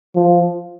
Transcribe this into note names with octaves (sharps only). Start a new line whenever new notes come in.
F3